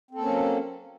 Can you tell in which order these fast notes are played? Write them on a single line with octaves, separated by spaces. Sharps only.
C4 A4 A#3 C#4 F#3